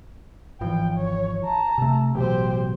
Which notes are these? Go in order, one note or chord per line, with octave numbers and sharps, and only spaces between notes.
G#1 E3 F3 G5
C#5
A5 A#5
C3 A3
A1 B2 F#3 G4 C5